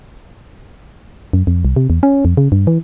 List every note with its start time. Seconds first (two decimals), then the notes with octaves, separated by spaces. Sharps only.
1.33 F#2
1.47 F2
1.65 C2
1.76 C3
1.90 E2
2.03 C#4
2.25 F2
2.37 C#3
2.52 G2
2.67 E3